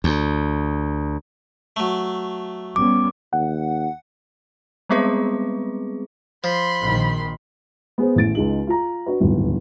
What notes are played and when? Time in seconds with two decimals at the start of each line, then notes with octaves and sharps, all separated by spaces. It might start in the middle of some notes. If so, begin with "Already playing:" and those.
0.04 D2
1.76 F#3 A3
2.76 G3 B3 C#4 D6
3.33 D#2 F#5
4.89 G3 G#3 B3 C4 G#4 B4
6.44 F3 B5 C6
6.81 A#1 D#3
7.98 B3 G#4 C5
8.15 A1 A2 A6 D7
8.35 C#2 G#3 D#4 F#7
8.67 F4 A#5
9.06 D4 F#4 B4
9.20 D1 G1 D#2 B2